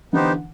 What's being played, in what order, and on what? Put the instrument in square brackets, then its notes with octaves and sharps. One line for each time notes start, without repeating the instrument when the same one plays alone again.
[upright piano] D3 E3 [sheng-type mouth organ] B3 D#4 G4 C5